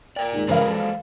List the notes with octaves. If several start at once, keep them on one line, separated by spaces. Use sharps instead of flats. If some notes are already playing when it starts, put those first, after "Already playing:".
A#4 D5 G5
D#2 G#2
C#3 E3 F#3 G#3 A#4 C5 D5 F5
A4